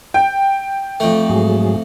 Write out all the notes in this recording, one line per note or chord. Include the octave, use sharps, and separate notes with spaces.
G5
F2 A3
G#2 F#3 G#4